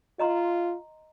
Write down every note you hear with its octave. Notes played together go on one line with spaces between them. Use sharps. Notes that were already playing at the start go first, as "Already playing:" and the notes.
F4 D#5 A#5 C6